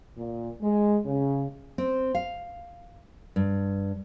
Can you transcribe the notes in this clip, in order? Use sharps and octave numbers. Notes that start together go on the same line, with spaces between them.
A#2
G#3
C#3
C4
F5
G2